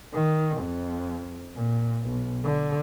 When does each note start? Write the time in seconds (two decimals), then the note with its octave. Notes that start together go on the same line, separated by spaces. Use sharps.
0.13 D#3
0.58 F2
1.55 A#2
2.07 B1
2.44 D3